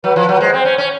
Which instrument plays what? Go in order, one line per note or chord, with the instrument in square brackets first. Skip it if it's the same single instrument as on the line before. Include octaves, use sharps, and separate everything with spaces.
[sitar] F#3 [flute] B4
[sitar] F3
F#3
[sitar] G#3 [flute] C5
[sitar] C4
[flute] C5
[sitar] C#4
[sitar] C#4 [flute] C#5